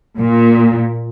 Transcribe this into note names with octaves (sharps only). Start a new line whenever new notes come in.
A#2